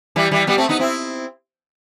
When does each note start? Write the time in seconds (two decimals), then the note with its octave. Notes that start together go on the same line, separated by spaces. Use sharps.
0.16 E3 G3
0.31 E3 G3
0.47 G3 B3
0.58 A3 C4
0.69 B3 D#4
0.80 C4 E4